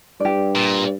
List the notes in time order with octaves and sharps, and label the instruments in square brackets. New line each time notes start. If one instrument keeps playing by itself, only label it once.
[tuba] G2 [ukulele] G4 D5
[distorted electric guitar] A#2